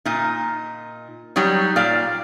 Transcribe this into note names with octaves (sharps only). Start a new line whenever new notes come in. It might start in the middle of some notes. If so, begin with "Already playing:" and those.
A#2 D#4
F#3 G3 D#4 C#5
A#2 D5 F5